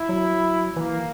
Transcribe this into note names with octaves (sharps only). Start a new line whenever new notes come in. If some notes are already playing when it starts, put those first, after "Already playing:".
Already playing: E4
F#3
E3 A#3